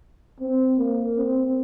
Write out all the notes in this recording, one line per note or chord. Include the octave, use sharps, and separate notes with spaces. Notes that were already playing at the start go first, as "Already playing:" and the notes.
C4
A#3
C4